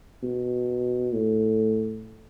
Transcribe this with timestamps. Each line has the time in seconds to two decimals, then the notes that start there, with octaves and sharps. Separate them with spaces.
0.23 B2
1.14 A2